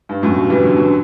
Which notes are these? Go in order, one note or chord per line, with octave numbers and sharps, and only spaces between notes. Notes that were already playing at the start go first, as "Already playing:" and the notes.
G2
F#2 A2
G2 B2
E3 G3
D3 F#3
D3 F#3